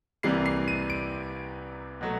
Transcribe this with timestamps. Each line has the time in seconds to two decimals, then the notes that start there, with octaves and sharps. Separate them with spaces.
0.23 C2 C3 E3 G3 A#3 C7
0.46 C7
0.68 D#7
0.90 D7
2.01 B2 F#3 A3